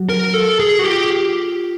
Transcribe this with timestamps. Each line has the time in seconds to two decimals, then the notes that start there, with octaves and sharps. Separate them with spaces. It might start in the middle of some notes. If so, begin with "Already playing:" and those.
Already playing: F#3 F#4
0.09 A#4
0.34 A4
0.60 G#4
0.79 F#4
0.83 F4 G4